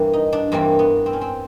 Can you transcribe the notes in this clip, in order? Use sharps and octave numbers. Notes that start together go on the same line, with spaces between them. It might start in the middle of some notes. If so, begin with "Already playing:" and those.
Already playing: G2 E3 G3 A#3
D#4
D4
G2 E3 G3 A#3 C4
B3
C4
C#4
C4